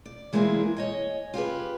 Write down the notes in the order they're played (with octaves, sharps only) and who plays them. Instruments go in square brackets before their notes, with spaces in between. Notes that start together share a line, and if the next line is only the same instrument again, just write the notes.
[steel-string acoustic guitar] D5
E3 G#3 A#3 C4 E4 G#4
C#5 D#5 G#5
F4 G4 G#4 B4